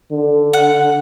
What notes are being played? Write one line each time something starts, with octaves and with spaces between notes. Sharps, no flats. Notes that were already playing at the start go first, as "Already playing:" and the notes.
D3
F#5